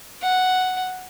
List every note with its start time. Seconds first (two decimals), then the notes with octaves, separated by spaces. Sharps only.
0.22 F#5